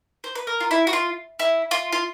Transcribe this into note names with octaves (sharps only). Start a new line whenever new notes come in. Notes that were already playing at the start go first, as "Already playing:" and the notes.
C5
B4
A#4
F4
E4
F#4
F4
E4
F4
F4